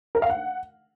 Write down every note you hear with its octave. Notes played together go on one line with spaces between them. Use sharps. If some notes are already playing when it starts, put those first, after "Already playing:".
A#4
F5
F#5